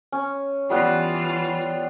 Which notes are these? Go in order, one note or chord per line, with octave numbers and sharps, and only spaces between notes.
C#4
E3 G3 B3 F4 B4